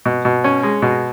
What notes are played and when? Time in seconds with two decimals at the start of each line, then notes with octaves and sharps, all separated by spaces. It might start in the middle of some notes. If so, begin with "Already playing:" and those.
0.06 B2
0.25 B2
0.44 C#4
0.63 G#3
0.82 B2